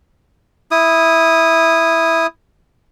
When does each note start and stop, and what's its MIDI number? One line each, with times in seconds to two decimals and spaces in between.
0.71 2.27 64
0.71 2.27 87